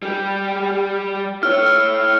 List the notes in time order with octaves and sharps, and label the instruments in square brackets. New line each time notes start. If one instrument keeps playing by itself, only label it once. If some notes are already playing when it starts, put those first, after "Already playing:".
[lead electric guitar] G3 G4
[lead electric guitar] E4 C#5 [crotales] F6